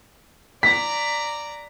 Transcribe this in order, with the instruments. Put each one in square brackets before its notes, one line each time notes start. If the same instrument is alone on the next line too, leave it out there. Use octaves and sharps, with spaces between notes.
[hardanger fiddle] D5 A#5 [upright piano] B6